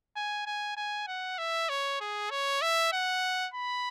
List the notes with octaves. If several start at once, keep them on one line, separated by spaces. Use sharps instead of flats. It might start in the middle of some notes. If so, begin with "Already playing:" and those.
G#5
G#5
G#5
F#5
E5
C#5
G#4
C#5
E5
F#5
B5